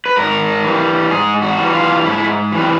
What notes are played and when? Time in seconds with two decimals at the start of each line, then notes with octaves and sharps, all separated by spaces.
0.06 B4
0.16 G#2 A#4
0.64 E3 G3
1.11 G#2 G#4
1.42 F#4
1.58 E3 G3
1.73 F4
2.05 G#2 E4
2.52 E3 G3
2.61 C4